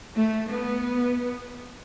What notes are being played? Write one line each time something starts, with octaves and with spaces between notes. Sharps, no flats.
A3
B3